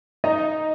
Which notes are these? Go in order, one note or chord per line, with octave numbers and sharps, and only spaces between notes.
D#4 D#5